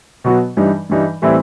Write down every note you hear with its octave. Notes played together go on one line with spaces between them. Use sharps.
B2 F#3 B3 F#4
G2 E3 G3 D#4
G2 E3 G3 D#4
A2 E3 G3 C4 E4